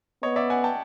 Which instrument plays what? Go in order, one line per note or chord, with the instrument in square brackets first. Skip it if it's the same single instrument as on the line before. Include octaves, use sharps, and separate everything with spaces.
[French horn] B3 [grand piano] C#5 D#5
[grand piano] D5 E5
F#5 G#5
G5 A5